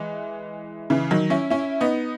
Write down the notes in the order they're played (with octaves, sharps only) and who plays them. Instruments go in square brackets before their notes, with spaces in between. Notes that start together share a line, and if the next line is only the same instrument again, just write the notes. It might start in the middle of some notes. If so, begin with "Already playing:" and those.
Already playing: [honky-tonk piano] E3 G#3
C#3 E3
D#3 F#3
C#4 E4
C#4 E4
B3 D#4